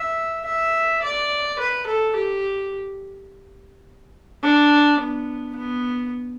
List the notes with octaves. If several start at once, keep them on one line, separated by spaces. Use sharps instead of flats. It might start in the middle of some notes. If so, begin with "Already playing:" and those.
Already playing: E5
E5
D5
B4
A4
G4
D4
B3
B3